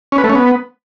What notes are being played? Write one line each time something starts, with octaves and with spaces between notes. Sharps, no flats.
C#4
B4
A3
C#4
B3